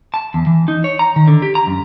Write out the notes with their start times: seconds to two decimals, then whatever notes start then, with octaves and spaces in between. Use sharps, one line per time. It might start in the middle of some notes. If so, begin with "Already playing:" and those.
0.14 A5
0.34 E2
0.47 E3
0.68 D#4
0.84 C#5
0.99 A#5
1.16 D#3
1.28 D3
1.42 G4
1.55 A#5
1.67 F#2